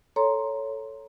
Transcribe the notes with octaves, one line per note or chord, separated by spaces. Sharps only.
A4 C#5 A#5 C6